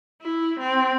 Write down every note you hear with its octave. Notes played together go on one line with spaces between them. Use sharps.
E4
C4